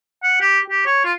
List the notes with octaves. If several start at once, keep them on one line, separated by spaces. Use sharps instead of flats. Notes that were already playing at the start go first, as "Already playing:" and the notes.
F#5
G4
G4
C#5
F4